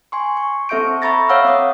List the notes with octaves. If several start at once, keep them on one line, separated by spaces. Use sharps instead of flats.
G#5 C6 C#6
C#6
C4 A4 E5 C#6 G6 D7
E5 A#5 B5 C#6 A6 A#6
C#5 F5 F#5 E6 F6
C4 D6 D#6